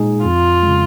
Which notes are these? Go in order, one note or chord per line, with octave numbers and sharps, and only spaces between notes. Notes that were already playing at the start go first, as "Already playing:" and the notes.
Already playing: A#2 G#3 D#4 G#4
F2 F4
C#3 G#3